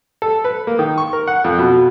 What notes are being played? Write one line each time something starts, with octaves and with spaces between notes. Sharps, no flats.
A4
B4
A#3
D#3
C#6
A#4
F#5
F2
B2